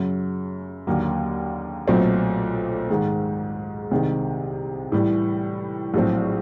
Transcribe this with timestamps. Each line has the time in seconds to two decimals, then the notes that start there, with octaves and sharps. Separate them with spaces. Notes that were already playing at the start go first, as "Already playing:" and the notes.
Already playing: F#2 C#3 F#3
0.87 D#2 D3 F#3 A#3
1.88 B1 A#2 F#3 A3 C4
2.90 G#2 D#3 G#3
3.91 C2 C3 D#3 G#3 C4
4.92 A2 E3 G3
5.94 A#1 A2 F#3 A3 C4